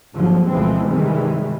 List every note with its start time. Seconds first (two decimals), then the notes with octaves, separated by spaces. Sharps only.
0.14 G#1 D#2 D3 F3 F#3
0.48 D2 B2 E3 F3 G#3 C4
0.86 G2 C3 D#3 E3 G3 G#3